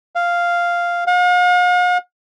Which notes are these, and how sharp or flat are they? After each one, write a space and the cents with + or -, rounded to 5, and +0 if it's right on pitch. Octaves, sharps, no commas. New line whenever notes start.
F5 -5
F5 +45